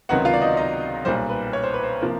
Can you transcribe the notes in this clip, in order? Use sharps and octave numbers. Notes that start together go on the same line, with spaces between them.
C#2 C3 D#3 F#3 B3 F#4 F#5
F4 F5
D5
D#4 D#5
D#4 D#5
B1 A#2 G3 C5
B4
C#5
C5
B4
C5
C3 F3 A#3